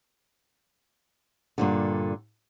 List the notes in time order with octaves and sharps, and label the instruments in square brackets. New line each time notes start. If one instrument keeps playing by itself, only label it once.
[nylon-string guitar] G2 A#2 D3